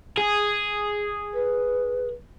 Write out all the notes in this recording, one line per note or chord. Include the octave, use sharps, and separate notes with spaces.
G#4
B4